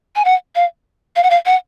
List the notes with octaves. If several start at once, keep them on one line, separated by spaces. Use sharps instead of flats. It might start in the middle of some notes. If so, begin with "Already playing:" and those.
G#5
F#5
F5
F5
F#5
F5
F#5